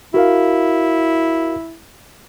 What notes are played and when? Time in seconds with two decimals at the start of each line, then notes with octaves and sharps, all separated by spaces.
0.14 E4 F#4 A#4 F5